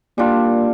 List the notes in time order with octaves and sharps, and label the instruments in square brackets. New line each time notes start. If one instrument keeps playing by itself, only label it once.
[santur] G3 D4 F4 [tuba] A#3